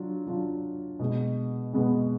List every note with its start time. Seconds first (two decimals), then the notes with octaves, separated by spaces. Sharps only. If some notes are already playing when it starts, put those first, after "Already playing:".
Already playing: F#3 D4 F4
0.26 F#3 D4 F4
0.99 B2 G#3 B3
1.74 B2 G#3 B3